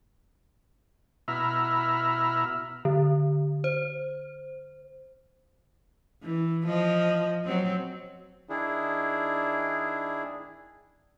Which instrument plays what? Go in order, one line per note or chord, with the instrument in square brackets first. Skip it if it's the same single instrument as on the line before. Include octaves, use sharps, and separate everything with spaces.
[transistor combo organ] B2 E4 E5 A#5 B5 F6
[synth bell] D3
C5
[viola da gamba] E3
F3 D#5
F#3 C4
[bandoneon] D#3 D4 E4 G#4